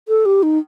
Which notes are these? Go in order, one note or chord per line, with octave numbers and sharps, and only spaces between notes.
A4
G4
D#4